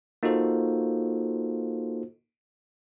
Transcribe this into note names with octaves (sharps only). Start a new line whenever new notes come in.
A#3 D#4 F4 F#4 A4 C5